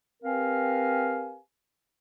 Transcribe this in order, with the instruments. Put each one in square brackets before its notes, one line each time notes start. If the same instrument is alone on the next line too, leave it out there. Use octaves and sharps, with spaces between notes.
[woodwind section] C4 G4 A#4 B4 F5 G#5